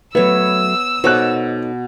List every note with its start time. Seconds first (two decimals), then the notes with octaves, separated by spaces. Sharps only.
0.15 F#3 A3 B3 B4 C#5 E6
1.04 B2 D#4 A4 C5 C#5 D6 F#6